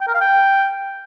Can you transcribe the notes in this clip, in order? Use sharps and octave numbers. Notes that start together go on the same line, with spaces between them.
G5
A#4
F5
G5